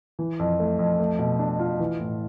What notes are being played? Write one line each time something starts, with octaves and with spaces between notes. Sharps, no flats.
E3
F2
A3
F2
A3
B2
D4
F4
E3
A2